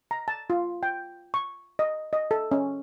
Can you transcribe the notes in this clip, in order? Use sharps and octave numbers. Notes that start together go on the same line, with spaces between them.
A#5
A5
F4
G5
C#6
D#5
D#5
A4
C#4